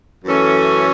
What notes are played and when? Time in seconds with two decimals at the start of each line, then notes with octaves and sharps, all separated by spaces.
0.25 F#2 E3 A3 C#4 A4